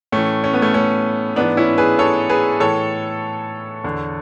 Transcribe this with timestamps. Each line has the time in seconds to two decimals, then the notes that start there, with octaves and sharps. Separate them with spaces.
0.12 A2 E3 A3 C#4
0.44 C#4
0.53 B3
0.62 A3 C#4
0.74 A3 C#4
1.36 G#2 E3 B3 D4
1.57 C#4 E4
1.78 G#4 B4
1.99 A4 C#5
2.29 G#4 B4
2.60 A2 E3 A4 C#5
3.84 E2 D3